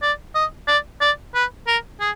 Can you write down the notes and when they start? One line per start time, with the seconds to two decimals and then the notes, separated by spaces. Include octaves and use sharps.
0.02 D5
0.35 D#5
0.68 D5
1.01 D5
1.35 B4
1.67 A#4
2.00 G#4